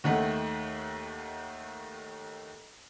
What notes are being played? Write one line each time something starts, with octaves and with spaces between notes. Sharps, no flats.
D#2 D#3 A3 F#5